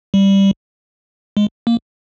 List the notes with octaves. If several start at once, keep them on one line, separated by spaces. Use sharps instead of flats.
G3
G#3
A#3